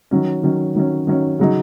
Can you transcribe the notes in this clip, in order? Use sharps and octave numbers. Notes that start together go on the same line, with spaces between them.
D#3 F#3 C#4
D#3 F#3 C#4
D#3 F#3 C#4
D#3 F#3 C#4
C#3 F#3 D#4